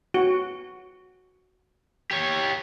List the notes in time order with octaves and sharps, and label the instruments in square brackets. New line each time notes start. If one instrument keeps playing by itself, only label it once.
[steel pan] F#4
[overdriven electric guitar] G4 C#5